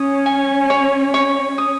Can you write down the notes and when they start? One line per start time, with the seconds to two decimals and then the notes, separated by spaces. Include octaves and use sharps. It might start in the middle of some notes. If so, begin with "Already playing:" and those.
Already playing: C#4 D#6
0.26 G#5
0.70 C#5
1.14 C#5
1.58 D#6